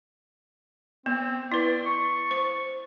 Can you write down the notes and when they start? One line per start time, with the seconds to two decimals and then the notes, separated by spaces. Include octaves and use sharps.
1.06 B3 C4
1.52 E4 B4 D5
1.86 C#6
2.31 C5